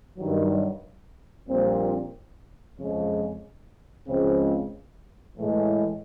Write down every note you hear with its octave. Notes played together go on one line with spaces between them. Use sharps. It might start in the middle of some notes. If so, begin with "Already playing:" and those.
G2 D#3 F#3
A#1 A#2 G3 C4
F2 C#3 F3 G#3
C#2 C#3 F3 G#3 C4
A2 E3 G#3